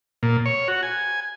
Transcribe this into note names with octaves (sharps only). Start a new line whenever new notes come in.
A#2
C#5
F#4
G#5